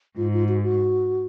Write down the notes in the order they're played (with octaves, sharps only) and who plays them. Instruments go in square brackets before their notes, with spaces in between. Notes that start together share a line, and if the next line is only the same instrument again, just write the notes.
[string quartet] G#2 [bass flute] F4
[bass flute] F4
F#4
F#4